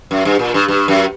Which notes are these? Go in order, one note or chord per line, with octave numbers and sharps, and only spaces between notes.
F#2
G2
A#2
G2
G2
F#2